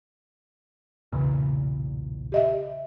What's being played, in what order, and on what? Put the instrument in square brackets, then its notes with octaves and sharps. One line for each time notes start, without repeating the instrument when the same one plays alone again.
[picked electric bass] B1 E2 A#2 [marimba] C#3
[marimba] G4 D#5 E5